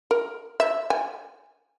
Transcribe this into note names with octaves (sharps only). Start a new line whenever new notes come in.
A#4
E5
G#5